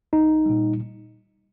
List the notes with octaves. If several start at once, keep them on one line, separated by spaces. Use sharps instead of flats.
B1 D#4
A#2 G3